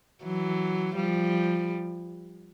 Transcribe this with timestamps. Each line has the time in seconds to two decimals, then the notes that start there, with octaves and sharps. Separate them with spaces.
0.23 E3 F#3
0.96 F3 G3